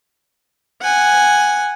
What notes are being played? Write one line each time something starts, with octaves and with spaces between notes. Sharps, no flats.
F#5 G#5